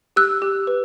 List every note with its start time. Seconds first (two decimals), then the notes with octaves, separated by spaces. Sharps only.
0.16 G4 E6 F#6
0.42 G4
0.67 B4